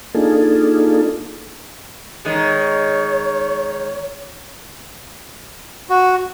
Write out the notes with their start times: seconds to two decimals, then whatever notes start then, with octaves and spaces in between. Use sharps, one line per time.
0.15 A#3 D4 D#4 F4 G#4 A4
2.25 D#3 G#3 C#5
5.90 F#4